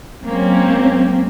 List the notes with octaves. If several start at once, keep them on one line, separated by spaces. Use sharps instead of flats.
F#3 G#3 A#3 C4 C#4